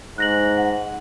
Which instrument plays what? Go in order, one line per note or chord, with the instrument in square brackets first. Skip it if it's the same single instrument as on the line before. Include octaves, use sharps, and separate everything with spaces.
[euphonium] G#2 [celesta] F#6 A#6 F#7
[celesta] F#5